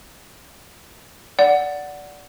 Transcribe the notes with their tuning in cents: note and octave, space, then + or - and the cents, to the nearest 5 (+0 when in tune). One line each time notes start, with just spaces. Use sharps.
D5 -15 F#5 +0